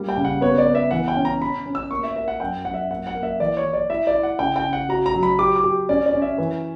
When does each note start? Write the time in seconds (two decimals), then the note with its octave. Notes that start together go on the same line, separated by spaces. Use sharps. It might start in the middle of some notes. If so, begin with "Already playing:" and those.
Already playing: G3 A#3
0.09 G5
0.17 C#3
0.25 F#5
0.41 B3 C#5
0.58 D5
0.66 B3
0.75 E5
0.91 E3 F#5
1.08 G5
1.16 C#4
1.25 A#5
1.41 C#4 B5
1.66 C#4
1.75 E6
1.91 A#3 C#6
2.03 E5
2.16 A#4 E5
2.28 F#5
2.40 F#2 G5
2.65 F#2 F#5
2.74 E5
2.90 A#3 F#5
3.07 F#5
3.15 A#3
3.23 E5
3.40 E3 D5
3.57 C#5
3.65 E3
3.73 D5
3.90 E4 E5
4.07 D5
4.15 E4
4.23 F#5
4.39 C#3 G5
4.56 G5
4.65 C#3
4.73 F#5
4.89 F#4 A#5
5.06 A#5
5.14 F#3
5.23 B5
5.39 G4 D6
5.56 D6
5.64 G4
5.89 C#4 D5
6.06 D5
6.13 C#4
6.22 E5
6.38 E3